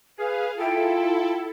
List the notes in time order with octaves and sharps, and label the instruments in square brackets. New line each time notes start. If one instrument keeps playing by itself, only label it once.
[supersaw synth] G#4 F5 [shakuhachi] B4
[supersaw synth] E4 A4 [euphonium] F4 [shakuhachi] G5